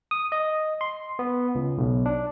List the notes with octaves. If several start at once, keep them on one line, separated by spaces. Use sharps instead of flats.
D#6
D#5
C6
B3
C#2
B1
D4